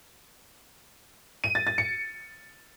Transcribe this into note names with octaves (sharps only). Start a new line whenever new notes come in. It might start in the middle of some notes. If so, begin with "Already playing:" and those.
D#7
A6
A6
C#7